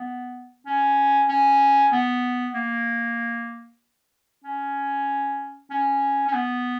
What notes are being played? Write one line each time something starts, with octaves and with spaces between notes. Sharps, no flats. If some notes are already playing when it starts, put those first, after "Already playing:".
Already playing: B3
C#4
C#4
B3
A#3
C#4
C#4
C#4
B3